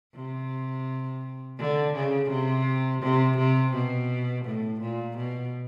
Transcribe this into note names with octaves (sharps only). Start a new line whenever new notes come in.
C3
D3
C#3
C3
C3
C3
B2
A2
A#2
B2